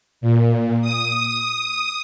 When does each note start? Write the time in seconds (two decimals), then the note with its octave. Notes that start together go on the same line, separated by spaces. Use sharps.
0.21 A#2
0.82 D#6